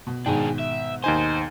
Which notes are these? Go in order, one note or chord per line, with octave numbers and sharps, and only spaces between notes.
B2
G#2 B2 D#3 D4 G#4 G5
E5
D#2 D#4 C5 G#5